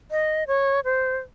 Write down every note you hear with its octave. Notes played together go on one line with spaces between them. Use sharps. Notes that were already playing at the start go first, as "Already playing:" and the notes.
D#5
C#5
C5